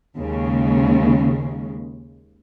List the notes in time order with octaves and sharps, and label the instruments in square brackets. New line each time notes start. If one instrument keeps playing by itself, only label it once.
[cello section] D#2 C#3 G#3